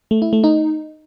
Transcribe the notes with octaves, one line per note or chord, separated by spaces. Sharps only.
A3
E4
A3
D#4